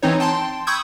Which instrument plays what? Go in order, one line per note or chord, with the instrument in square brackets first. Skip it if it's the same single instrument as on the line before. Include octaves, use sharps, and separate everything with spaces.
[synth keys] E3 C4 D#4 C#5
G5 A5 C6
B5 C#6 D#6 E6 G6 G#6